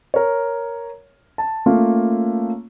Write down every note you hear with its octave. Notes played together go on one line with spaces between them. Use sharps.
A#4 C#5
A5
A3 A#3 C#4 F4